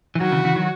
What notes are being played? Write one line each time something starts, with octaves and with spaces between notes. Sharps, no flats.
E3
D#3 F#3 F#4
C#3 E3
C#3 E3
D#3 F#3